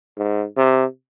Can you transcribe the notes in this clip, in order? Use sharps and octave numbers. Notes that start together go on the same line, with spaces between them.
G#2
C3